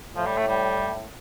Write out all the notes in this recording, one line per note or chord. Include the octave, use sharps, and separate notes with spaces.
A2 F3
G3
A3
G3